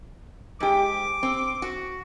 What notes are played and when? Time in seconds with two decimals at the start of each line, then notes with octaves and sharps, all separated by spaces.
0.60 G#2 G4 D6
1.23 C4
1.62 F#4